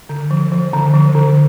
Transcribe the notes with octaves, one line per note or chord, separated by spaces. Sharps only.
D3
F3
F3
D3
F3
D3